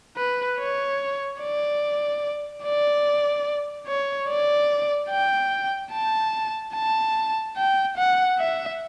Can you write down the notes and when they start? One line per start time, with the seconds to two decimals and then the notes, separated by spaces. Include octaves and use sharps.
0.17 B4
0.59 C#5
1.41 D5
2.64 D5
3.87 C#5
4.29 D5
5.10 G5
5.92 A5
6.75 A5
7.57 G5
7.97 F#5
8.39 E5